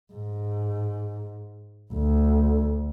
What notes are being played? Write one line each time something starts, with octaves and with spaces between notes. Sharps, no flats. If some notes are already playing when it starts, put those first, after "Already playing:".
G#2
D2